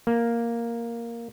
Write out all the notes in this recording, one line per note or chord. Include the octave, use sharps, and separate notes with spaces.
A#3